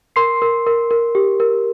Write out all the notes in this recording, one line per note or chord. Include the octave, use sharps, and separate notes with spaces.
A#4 C6 C7
A#4
A#4
A#4
G4
A#4